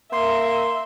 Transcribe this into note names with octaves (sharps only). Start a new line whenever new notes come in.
A#3 E5 C6